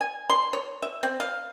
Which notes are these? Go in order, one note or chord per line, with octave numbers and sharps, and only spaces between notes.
G#5
C6
C#5
E5
C4
F5